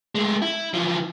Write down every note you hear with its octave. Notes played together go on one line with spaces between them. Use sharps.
G#3 A3
E4
E3 F3